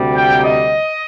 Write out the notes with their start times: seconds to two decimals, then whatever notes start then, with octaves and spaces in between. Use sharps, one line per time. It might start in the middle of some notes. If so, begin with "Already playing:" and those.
Already playing: D2 C3 G3
0.16 G5
0.43 D#5